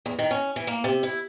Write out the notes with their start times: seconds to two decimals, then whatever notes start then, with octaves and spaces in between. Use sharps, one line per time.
0.06 E2
0.19 D#3
0.31 C#4
0.56 E3
0.67 A#3
0.84 C3
1.03 E4